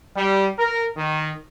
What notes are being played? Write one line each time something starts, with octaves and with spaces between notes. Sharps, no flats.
G3
A#4
D#3